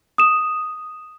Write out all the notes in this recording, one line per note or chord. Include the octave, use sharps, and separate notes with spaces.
D#6 E7